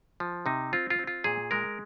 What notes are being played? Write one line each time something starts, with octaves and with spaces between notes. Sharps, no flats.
F3
C3 D#4
C4 F4
F4
C4
F4
A#2 G#4
G#3 A#4